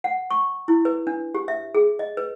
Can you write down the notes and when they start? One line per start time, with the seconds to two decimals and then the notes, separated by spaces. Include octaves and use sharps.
0.04 F#5
0.31 C#6
0.68 E4
0.85 B4
1.07 D4
1.35 G4
1.48 E5
1.75 G#4
1.99 D#5
2.17 B4